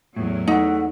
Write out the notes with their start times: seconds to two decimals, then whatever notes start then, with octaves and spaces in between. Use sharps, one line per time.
0.16 E2 A2 F#3
0.48 A3 D#4 F#5